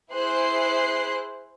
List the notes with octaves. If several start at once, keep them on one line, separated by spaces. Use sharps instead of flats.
E4 G#4 C5 C6 F#6 C7